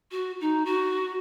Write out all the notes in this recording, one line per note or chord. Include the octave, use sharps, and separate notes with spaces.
F#4
D#4
F#4